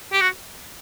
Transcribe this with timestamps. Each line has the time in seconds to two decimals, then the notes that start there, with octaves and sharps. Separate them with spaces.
0.12 G4
0.21 F#4